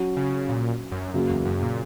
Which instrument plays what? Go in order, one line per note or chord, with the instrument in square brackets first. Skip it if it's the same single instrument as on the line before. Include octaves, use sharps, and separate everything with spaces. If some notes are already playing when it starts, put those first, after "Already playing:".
Already playing: [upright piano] F#3 C#4 F#4
[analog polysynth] C#3
A#2
F#2
[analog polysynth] F#2 [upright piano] C#3 F#3 A#3
[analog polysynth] E2
F#2
A#2